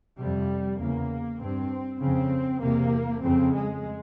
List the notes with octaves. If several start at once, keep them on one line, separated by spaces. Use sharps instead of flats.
F2 C3 G3
E2 C#3 A#3
G2 C4
F2 C#3 C4
E2 C3 A#3
F2 C#3 C4
G#3